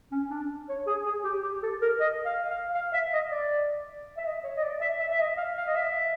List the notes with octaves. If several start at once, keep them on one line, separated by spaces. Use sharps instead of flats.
C#4
D4
C#5
G#4
G#4
G4
G4
A4
A#4
D#5
F5
F5
F5
E5
D#5
D5
E5
D#5
C#5
D#5
D5
E5
E5
E5
D#5
F5
F5
D#5
E5